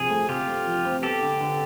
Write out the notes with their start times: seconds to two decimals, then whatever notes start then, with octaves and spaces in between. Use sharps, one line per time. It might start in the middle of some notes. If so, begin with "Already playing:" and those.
Already playing: C3 F3 G#4
0.10 A3
0.29 C3 F4 G4
0.47 C4
0.66 F3
0.84 C4
1.03 B3 G4 A4
1.21 D3
1.41 D3